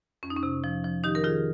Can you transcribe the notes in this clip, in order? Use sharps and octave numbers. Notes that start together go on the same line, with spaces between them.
F2 C#4
D#4
C#4
C3
F3
F3
D#3 D#4 G4
A#4
D#3 F4 G#4